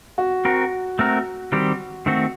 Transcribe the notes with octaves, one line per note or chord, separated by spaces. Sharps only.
F#4
C4 F#4 A#4
A3 C4 F#4 A#4
D#3 G3 C4 G4
D#3 A3 C4 F#4